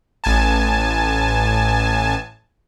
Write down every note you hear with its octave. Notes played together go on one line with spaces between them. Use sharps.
A1 G#5 A5